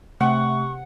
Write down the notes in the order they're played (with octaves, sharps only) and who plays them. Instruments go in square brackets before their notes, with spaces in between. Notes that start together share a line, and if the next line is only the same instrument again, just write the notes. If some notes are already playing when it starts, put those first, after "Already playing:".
[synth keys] C3 [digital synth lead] A3 [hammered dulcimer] F#5 [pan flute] C#6